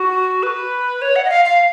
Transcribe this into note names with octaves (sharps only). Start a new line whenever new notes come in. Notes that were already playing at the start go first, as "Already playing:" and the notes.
Already playing: F#4
B4
C#5
F#5
D#5
F5
F5